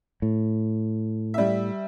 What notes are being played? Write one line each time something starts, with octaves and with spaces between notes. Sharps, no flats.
A2
G3 E5